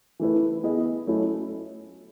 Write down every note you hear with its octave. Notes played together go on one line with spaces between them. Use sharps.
E3 A3 E4 B4
B3 E4 G#4 D#5
F#3 A3 C#4 E4